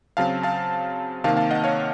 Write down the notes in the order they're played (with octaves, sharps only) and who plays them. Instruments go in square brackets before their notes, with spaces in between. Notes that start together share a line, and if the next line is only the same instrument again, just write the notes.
[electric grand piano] C#3 F#3 C4 F5 A5
F5 A5
C3 D#3 A#3 F5 A5
F5 A5
D#5 F#5
C#5 F5